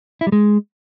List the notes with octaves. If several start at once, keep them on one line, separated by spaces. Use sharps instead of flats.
E4
G3
G#3